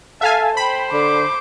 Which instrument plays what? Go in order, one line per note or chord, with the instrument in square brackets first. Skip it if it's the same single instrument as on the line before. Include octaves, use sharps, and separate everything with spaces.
[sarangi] A4 [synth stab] E5 F5 G#5
[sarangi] C5 [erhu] G5 [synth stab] B5
[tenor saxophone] D3 [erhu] D6